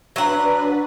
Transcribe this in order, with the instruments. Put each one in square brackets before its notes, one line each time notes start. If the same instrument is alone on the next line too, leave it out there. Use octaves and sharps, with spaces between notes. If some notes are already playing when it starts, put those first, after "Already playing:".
[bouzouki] F#3 F#5 [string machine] D4 B4